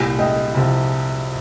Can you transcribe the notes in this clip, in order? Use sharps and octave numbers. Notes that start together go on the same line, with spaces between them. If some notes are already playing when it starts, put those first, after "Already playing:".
Already playing: C2 A#2 G3 D#5 G5
D#5 G5
C2 C3 F3